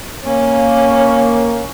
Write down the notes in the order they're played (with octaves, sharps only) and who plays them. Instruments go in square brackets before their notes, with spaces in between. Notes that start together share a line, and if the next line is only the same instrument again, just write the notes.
[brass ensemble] A#3 [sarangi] C#4